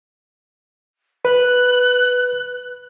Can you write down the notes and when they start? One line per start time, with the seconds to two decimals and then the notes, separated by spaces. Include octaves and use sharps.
1.25 B4 F#6